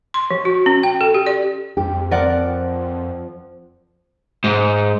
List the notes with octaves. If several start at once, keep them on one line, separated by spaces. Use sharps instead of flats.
C6
F3
F#4
C#4
G5
A4
G4
D5
F2 G4
F3 C4 A#4 D5 F#5
G#2